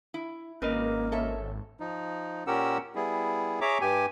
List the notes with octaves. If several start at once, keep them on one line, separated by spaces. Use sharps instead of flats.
E4
G#1 A#3 C#4 A#4 B4 D#5
A4 C#5 E5
F3 D#4
A#2 C#4 G4 A#4 F#5 E6
G3 B3 E4 G#4
G#4 C#5 E5 A#5 D6
G2 G4 G#5